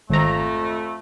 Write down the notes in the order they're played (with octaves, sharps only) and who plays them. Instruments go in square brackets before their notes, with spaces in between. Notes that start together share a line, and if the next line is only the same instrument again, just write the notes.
[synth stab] G#1 A#5 [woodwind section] F2 A3